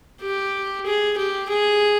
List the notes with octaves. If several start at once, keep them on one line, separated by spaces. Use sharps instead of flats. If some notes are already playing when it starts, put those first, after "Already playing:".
G4
G#4
G4
G#4